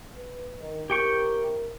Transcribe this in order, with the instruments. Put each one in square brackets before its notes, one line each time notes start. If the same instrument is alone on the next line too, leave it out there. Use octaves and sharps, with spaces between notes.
[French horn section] B4
D#3
[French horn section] C4 E4 A#4 [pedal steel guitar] G4 G5 C#6